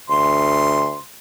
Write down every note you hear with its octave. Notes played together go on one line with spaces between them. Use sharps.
D2 C6